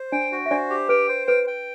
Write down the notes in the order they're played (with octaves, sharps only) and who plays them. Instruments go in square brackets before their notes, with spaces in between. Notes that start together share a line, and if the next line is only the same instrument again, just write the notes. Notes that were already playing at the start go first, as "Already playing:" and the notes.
Already playing: [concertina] C5
[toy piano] D4 D5 [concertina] G5
[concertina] F#4
[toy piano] E5
[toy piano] D4 D5 [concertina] C5
[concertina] G4
[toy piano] B4 [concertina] G5
[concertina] C5
[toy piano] B4 [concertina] G5
[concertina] G5